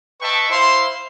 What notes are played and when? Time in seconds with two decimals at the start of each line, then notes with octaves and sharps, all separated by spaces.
0.21 B4 D#5 E5 G5 A5 C#6
0.50 E4 C5 F5 C6